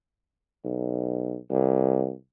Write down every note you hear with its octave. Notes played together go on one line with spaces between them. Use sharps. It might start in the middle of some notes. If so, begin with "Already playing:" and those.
B1
C2